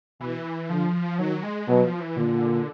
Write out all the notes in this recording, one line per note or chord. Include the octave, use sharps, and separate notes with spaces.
B2 E3
D3 F3
D#3 F#3
G#3
B2 F#3
F3
E3
A#2 D3